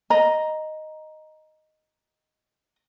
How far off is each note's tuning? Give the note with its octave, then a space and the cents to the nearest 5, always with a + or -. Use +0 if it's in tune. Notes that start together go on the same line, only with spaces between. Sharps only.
D#5 +0 A#5 +10